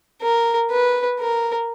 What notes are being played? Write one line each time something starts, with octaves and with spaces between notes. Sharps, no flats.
A#4
B4
A#4